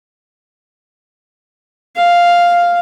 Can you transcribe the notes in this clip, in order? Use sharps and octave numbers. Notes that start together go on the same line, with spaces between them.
F5